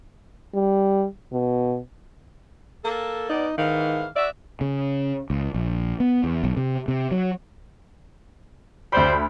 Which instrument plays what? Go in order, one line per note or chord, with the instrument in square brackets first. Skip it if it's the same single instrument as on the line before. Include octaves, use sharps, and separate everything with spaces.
[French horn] G3
B2
[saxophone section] A#3 A4
[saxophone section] B2 B3 D5 [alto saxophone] D#4
[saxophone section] G#2 E3 F5 [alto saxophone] D#3
[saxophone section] F#4 E5 [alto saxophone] D5
[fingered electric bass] C#3
C#2
A#1
B3
E2
B1
C3
C3
F#3
[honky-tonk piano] D2 B5 [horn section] G3 C5